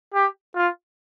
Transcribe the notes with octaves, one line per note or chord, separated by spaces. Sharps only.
G4
F4